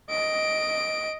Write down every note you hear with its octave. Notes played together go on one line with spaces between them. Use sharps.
D#5 D7